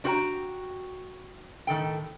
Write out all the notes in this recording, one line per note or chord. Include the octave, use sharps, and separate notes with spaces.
D4 F#4 G4 B4 G5 A#5
A2 D#3 A4 G5